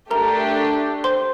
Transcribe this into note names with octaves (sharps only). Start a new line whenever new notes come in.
A3 D4 G4 A#4 A#5
C5 C6